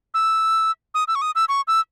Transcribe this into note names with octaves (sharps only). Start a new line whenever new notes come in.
E6
D#6
E6
C#6
D#6
E6
C#6
E6